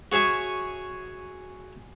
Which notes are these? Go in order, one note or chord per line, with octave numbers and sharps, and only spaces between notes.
F#4 G#4 C#5 E5 G#5